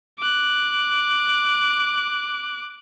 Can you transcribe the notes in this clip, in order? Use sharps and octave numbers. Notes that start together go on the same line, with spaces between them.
D6 F#6